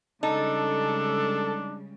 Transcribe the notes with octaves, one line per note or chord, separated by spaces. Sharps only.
C#3 G3 G#3 D4 D#4 A4